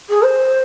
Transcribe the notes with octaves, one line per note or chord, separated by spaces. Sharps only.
G#4
C5